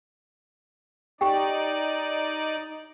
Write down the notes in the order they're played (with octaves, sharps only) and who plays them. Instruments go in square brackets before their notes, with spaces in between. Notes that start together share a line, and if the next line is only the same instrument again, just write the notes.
[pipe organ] D#4 D5 [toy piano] G4 G5